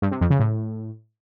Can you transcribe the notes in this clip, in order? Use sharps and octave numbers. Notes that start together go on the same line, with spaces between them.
G2
C3
F2
C#3
A2